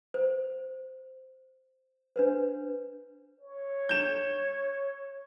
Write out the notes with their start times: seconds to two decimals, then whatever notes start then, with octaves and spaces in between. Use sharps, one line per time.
0.14 C5
2.16 D4 B4 C5
3.40 C#5
3.89 G6 E7